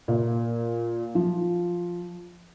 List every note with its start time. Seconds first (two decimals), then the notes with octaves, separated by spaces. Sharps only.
0.08 A#2
1.15 F3